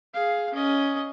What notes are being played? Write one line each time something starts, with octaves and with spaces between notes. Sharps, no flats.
G#4 F5
C#4 D#5